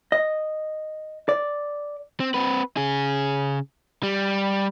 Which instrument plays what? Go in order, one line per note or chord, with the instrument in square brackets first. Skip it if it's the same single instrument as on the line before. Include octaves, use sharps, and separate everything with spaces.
[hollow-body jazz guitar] D#5
D5
[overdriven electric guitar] C4
C4 B4
C#3 G#4
G3